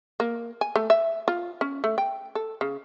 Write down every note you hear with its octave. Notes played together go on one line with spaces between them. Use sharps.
A#3
G#5
A3
E5
F4
C#4
A3
G5
A4
C#3